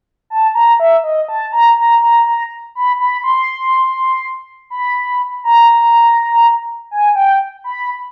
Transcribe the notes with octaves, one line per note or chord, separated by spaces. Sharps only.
A5
A#5
E5
D#5
A5
A#5
A#5
A#5
A#5
B5
B5
C6
B5
A#5
G#5
G5
B5